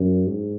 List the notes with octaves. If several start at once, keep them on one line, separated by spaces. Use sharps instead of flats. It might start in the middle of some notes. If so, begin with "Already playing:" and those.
Already playing: F#2
G#2